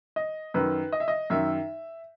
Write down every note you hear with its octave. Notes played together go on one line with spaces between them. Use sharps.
D#5
F#2 D#3 B4
D#5
E5
D#5
F#2 D#3 E5